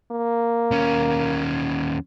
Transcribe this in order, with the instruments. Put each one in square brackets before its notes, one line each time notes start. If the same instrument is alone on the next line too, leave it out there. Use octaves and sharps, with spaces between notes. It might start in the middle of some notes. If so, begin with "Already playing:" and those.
[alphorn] A#3
[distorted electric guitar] D#2 C#4